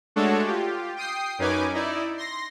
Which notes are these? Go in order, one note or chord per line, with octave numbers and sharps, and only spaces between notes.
G#3 A3 D4 F#4 A4 C#5
F4 G4
G5 D#6 C7
F#2 C#4 D#4 B4 G#5 D6
D#4 E4 D5
C6 A#6